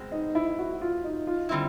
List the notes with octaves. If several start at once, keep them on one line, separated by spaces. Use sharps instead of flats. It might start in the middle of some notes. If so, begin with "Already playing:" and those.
Already playing: B2 G#3 C4
D#4
E4
F#4
F4
D#4
F4
D3 G3 C4 E4